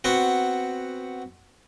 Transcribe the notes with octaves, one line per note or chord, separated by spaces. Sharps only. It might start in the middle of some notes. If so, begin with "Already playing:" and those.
B3 C4 F#4